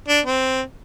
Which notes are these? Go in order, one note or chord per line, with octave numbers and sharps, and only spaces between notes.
D4
C4